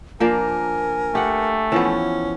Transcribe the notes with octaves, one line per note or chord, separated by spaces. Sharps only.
F3 A#3 D4 A#4 G#5
A3 G4 F#5
E3 F3 B3 C#4